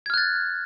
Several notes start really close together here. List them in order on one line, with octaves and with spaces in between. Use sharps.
G#6 F6 F#6 A6